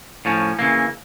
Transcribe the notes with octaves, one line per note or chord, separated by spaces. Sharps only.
A2 F3 C#4
C#3 E3 A#3